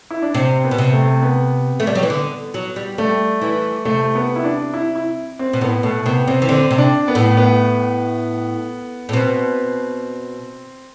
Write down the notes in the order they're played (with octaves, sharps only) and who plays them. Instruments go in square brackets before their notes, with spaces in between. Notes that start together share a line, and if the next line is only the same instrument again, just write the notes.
[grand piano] E4
D4
[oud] C3 [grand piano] C4
[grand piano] B3
[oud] B2
C3
[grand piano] A3
B3
[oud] A3
G3
F#3
E3
D3
F#3
G3
[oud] G3 [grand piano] A3
[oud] E3
[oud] C3 [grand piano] A3
[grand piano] B3
E4
D4
E4
E4
C4
[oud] B2
[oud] A2 [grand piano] B3
[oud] B2 [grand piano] A3
[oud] C3 [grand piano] B3
[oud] C3 [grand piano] C4
[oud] E3
[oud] D3 [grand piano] C4
[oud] C3
[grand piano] D4
B3
[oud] A2
[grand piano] B3
[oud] A2
[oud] B2 [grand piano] C4